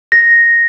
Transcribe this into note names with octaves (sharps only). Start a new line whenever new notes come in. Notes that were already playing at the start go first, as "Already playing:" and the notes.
A#6